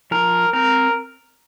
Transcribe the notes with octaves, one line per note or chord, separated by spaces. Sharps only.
F3 A#4
C4 A#4